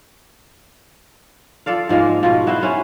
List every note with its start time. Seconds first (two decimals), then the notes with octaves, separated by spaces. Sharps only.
1.66 F3 A4 D5 F5
1.89 G#2 F3 G#3 A#3
2.23 B2 F3
2.47 B3 E4 F#4 C5
2.61 B3 C#4 E4